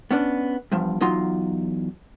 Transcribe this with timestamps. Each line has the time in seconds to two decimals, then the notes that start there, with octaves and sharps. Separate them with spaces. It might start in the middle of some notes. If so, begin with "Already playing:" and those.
0.11 B3 C#4 D4
0.72 E2 G2 F3
1.01 E2 F#3 D#4 F4 C6